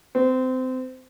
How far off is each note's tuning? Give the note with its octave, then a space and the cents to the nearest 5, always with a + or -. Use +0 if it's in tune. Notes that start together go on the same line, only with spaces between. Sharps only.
C4 -25